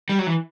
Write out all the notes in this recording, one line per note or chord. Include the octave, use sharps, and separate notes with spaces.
G3
F#3
E3